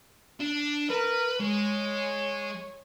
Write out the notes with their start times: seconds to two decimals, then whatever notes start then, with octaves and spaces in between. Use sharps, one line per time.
0.40 D4
0.90 A#4 B4
1.40 G#3 C#5